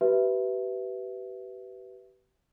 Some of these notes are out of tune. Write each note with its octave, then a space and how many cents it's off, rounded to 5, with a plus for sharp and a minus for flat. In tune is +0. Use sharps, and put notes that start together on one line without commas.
G4 -35 B4 +0 E5 +0